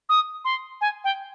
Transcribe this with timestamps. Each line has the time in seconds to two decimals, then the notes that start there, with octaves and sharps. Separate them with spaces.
0.09 D#6
0.45 C6
0.81 G#5
1.04 G5